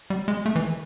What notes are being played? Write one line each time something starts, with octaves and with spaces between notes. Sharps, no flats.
G3
G#3
A3
E3